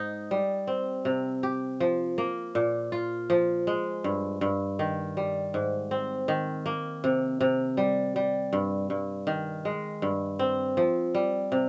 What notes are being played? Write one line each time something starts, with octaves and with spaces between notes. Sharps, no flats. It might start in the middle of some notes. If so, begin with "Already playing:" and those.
Already playing: G#2 D#4
G3
C4
C3
G4
F3
A#3
A#2
F4
F3
G#3
G2
G2
D#3
G3
G#2
C4
D#3
A#3
C3
C3
G3
G3
G2
G2
D#3
G#3
G2
C4
F3
G3
C3